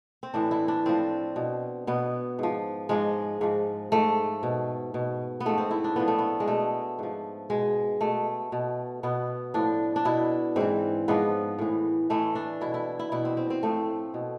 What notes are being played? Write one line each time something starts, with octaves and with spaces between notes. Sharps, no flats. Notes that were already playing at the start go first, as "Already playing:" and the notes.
C4
A2 E3 D4
E4
D4
A2 F3 C4
B2
B2 B3
G#2 F3
G#2 F3 G#3
G#2 F3
G#2 F3 A3
B2
B2
B3
G#2 F3 A3
C4
E4
D4
A2 F3 B3
A3
B3
G#3
B2 A3
G#2 F3
B2 G#3
B2 A3
B2
B2 B3
A2 F3 D4
D4
B2 E4
G#2 E3 C4
G#2 F3 B3
A2 E3
A2 E3 A3
D4
B2 E4
E4
E4
B2 E4
C4
C4
C4
A2 F3 A3
B2